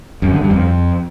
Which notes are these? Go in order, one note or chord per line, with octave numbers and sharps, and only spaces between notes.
F#2
D3
G2
F2